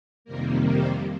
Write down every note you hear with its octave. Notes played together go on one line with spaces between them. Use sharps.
F2 C3 D#3 G3 A#3 A#4
C5